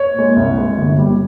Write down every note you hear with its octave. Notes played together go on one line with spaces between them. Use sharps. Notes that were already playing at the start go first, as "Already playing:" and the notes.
Already playing: C#5
A#2 G#3
C2
A#2 G#3
G1
G3